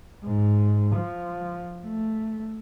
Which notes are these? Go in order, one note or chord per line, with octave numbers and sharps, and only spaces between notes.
G#2
F3
A3